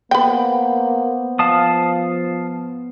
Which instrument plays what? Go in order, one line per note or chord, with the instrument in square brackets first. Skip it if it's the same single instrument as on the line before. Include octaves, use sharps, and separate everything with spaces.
[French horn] A#3 [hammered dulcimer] B3 C5 [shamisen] B4 G5
[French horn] F3 [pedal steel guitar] F5 A5 D#6